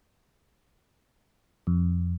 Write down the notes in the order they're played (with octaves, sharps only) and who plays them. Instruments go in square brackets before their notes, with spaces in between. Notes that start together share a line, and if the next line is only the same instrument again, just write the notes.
[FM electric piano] F2